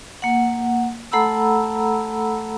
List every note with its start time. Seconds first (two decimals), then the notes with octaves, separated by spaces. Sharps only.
0.22 A#3 F#5
1.12 A3 A4 F#5 A#5 B5 E6